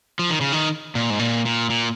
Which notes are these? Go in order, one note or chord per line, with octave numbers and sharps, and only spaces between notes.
F3
D#3
C#3
D#3
A#2
G#2
A#2
A#2
A#2